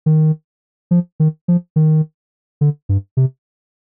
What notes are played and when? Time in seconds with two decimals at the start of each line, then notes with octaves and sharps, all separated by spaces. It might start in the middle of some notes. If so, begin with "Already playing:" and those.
0.06 D#3
0.91 F3
1.20 D#3
1.48 F3
1.76 D#3
2.61 D3
2.89 G2
3.17 C3